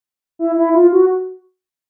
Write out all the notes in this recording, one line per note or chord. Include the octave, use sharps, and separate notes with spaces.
E4
E4
F4
F#4